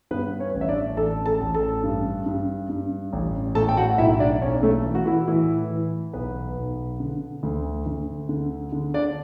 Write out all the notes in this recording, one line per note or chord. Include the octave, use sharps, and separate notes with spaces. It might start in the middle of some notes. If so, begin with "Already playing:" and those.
G2 B3 B4
C#4 C#5
A1
E5
D4 D5
A1 A4 A5
A4 A5
A1
A4 A5
G2
G2
G2
A1
A2 A4 A5
G5
F#4 F#5
B1 E4 E5
D4 D5
B1 C#4 C#5
A3 A4
E3
F#4
E3 E4
A2 E3 E4
E3
B1 B3 B4
B1
D3
D2
D2
D3
D3
D4 D5